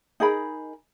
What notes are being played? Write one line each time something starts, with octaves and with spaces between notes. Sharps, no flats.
D#4 G#4 A#4 B5